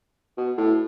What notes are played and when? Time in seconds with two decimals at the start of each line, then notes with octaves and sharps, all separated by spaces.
0.37 B2
0.57 A2